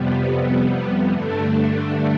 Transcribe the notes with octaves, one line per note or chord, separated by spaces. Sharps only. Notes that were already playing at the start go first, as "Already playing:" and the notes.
Already playing: F2 C3 G3 B3
G2 D3 A3 D4